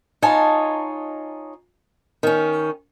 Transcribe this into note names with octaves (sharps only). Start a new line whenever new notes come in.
D#4 F4 C#5 D#5 G#5 A5
D#3 C#4